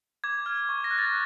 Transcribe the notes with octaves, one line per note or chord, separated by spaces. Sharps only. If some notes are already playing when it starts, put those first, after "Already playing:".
D6 G#6
F6
C#6
A#6
F#6
A6